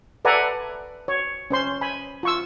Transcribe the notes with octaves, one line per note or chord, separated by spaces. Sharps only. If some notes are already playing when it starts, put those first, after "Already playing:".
A4 B4 D5 F#5 G#5 A#5
C#5
C#4 C5 C6
G#5 B5
F4 C#6 E6